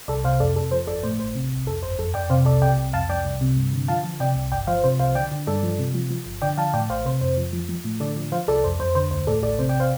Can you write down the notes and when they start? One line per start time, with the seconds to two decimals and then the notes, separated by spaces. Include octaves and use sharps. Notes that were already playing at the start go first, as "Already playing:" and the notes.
0.08 C2 A4 D5
0.24 C3 C5 F5
0.40 F2 A4 D5
0.56 F2 A4
0.71 F3 C5
0.87 G1 A4 D5
1.03 A2 C5
1.19 A1 C5
1.35 C3
1.51 C2
1.67 F2 A4
1.83 G1 C5
1.99 F2 A4
2.14 F2 D5 G5
2.30 C3 C5 F5
2.45 C2 A4 D5
2.62 C3 D5 G5
2.77 C2
2.93 F2 F5 A5
3.09 F2 D5 G5
3.25 C2
3.41 C3
3.57 G2
3.73 D3
3.88 F3 F5 A5
4.04 F3
4.20 C3 D5 G5
4.36 C2
4.52 G1 D5 G5
4.67 F3 C5 F5
4.84 C3 C5
4.99 C2 C5 F5
5.15 D3 D5 G5
5.31 D3
5.47 G2 A4 D5
5.63 F3
5.79 C3
5.94 F3
6.10 F3
6.26 G1
6.42 D3 D5 G5
6.57 F3 F5 A5
6.74 A2 D5 G5
6.90 A1 C5 F5
7.05 C3 C5
7.21 F2 C5
7.37 F3
7.53 F3
7.69 F3
7.84 A2
8.00 D3 A4 D5
8.16 F3
8.32 F3 C5 F5
8.48 C2 A4 D5
8.64 F2 C5
8.80 F2 C5
8.95 D3 C5
9.11 D2 C5
9.27 A2 A4 D5
9.43 A1 A4 D5
9.59 C3 C5
9.69 D5 G5
9.80 C5 F5